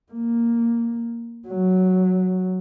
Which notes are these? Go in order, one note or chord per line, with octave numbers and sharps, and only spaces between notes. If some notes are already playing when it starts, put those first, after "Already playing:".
A#3
F#3